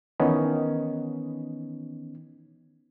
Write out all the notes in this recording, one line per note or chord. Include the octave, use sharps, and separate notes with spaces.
D#3 E3 B3 C#4 D#4